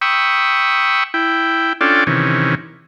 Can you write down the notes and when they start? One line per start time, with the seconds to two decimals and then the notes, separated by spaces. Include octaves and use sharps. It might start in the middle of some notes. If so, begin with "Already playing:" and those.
0.02 G5 B5 C#6 D#6 E6
1.14 E4 G5
1.81 C#4 D4 F4 A4 D5 G5
2.07 C3 D#3 E3 C#4